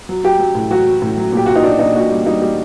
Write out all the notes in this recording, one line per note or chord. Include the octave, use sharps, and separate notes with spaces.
F#3
F#3 G4
F#3
A2
F#3 F#4
F#3
A2
F#3
A#2 G4
A#2 F#4
D#4
A#2 D4
A#2 D#4
A#2 F#4
G3
G3 D#4
G3